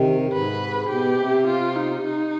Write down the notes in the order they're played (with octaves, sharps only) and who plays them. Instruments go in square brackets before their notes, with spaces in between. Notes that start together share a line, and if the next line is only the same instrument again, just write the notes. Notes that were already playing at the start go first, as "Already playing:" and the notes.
Already playing: [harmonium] C3 D#3
[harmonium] G#2 [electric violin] B4
[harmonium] B2 [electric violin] G4
[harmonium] C3
[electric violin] F4
D#4
D#4